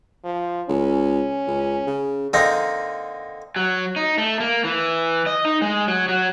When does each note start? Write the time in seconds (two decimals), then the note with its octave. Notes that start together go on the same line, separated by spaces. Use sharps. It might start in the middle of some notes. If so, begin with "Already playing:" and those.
0.24 F3
0.69 C#2 C#4
1.47 C#2
1.87 C#3
2.33 D3 A#3 C4 D#4
3.56 F#3
3.96 D#4
4.18 A3
4.40 A#3
4.64 E3
5.26 D#5
5.45 D#4
5.62 G#3
5.88 F#3
6.09 F#3